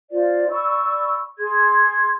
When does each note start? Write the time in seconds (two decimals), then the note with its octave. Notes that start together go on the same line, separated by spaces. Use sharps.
0.11 F4 C5 D5
0.51 D5 B5 C#6 E6
1.38 G#4 C6 G#6